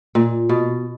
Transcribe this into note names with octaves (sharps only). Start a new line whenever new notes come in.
A#2
B2